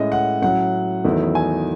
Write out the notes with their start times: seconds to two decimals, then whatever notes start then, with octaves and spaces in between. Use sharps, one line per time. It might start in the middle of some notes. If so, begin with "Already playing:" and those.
Already playing: A2 G#3 C#4 D#5
0.12 F#5
0.42 A2 F#3 C#4 F#5
1.04 E2 D#3 F#3 A3 E4
1.35 G#5